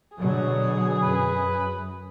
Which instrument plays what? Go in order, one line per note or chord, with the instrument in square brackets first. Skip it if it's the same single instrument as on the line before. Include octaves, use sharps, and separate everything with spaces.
[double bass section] B2 D3 F#3 [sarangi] G#4
[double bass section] F#2 [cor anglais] B4